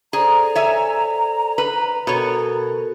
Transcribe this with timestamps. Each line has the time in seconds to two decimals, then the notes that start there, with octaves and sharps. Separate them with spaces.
0.13 G#4 A4 C5 D5 A#5
0.55 C#5 E5 G#5
1.58 B4
2.07 B2 F#4 A4 A#4 C#5